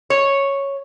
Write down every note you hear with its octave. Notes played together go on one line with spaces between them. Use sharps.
C#5